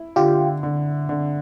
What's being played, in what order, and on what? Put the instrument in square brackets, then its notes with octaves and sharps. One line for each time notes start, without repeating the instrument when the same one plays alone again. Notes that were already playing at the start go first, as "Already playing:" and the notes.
Already playing: [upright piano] E4
[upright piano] D3 [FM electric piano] F4 G4
[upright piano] D3
D3